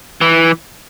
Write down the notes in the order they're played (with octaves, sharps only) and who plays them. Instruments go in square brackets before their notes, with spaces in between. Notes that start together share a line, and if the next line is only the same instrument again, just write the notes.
[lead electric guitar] E3